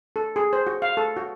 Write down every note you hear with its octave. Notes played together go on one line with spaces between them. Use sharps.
A4
G#4
C5
F#4
F5
A4
F#4